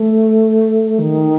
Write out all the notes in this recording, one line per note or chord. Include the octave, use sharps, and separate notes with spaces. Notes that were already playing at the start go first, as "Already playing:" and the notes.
Already playing: A3
D#3